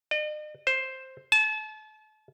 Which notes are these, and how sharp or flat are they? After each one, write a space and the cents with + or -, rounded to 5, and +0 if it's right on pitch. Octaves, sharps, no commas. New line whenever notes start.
D#5 -45
C5 +5
A5 -35